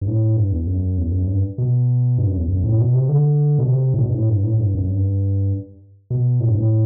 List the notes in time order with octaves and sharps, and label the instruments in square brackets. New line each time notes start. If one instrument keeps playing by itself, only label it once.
[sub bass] G2
A2
G2
E2
F#2
E2
F#2
G2
B2
G2
F#2
E2
F#2
A2
B2
C3
D3
B2
C3
A2
B2
G2
A2
G2
A2
A2
G2
F#2
G2
B2
A2
G2
A2